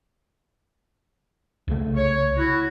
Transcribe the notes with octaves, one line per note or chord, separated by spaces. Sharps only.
C2 C#3 A3
C#5
E4 F#4